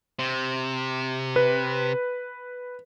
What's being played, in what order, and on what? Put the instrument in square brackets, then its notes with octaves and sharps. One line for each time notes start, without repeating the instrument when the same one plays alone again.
[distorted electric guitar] C3
[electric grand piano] B4